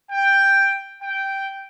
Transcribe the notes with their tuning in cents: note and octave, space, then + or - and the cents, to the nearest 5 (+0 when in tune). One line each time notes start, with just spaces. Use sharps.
G5 +5
G5 -5